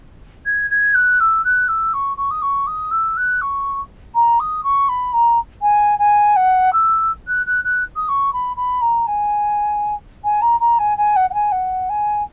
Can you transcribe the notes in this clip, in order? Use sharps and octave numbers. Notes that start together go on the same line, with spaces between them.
G#6
G#6
F#6
E6
F#6
E6
C#6
C#6
D#6
C#6
D#6
E6
F#6
C#6
A#5
D#6
C#6
B5
A#5
G#5
G#5
F#5
E6
F#6
F#6
F#6
D#6
C#6
B5
B5
A#5
G#5
G#5
A#5
A#5
G#5
G#5
F#5
F#5
G#5
F#5
G#5